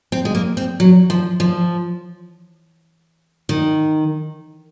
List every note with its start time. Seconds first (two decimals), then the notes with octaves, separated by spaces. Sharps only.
0.12 C4
0.25 G#3
0.35 A#3
0.57 C4
0.80 F#3
1.10 F3
1.40 F3
3.49 D#3